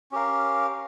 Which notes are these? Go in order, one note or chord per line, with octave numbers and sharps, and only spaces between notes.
C#4 G4 A#4 F5